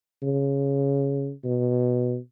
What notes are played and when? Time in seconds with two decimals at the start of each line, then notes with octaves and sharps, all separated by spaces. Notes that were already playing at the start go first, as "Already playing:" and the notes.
0.22 C#3
1.44 B2